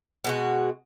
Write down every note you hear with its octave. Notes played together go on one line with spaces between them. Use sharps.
B2 G#3 F#4